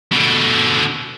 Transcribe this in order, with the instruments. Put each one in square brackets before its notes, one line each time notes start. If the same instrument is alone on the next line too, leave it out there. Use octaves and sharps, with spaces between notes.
[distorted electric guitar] B2 D3